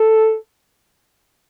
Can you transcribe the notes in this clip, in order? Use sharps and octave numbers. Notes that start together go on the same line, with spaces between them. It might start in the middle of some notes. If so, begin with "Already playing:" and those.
Already playing: A4